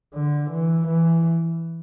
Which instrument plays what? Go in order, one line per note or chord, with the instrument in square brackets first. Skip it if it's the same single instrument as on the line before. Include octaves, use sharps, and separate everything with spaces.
[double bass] D3
E3
E3